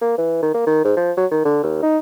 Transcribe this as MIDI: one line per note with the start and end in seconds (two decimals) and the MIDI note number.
0.01 0.15 58
0.18 0.42 52
0.42 0.53 51
0.54 0.63 58
0.67 0.84 51
0.85 0.94 44
0.97 1.12 53
1.17 1.26 54
1.31 1.45 51
1.45 1.62 50
1.63 1.82 39
1.83 1.98 63